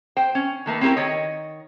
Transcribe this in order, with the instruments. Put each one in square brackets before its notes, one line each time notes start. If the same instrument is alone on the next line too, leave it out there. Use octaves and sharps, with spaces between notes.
[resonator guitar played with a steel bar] C5 G5
C#4
D#3 A3 A#3 B4
C4 C#4 E4 G4 A#4
D#3 C#5 D#5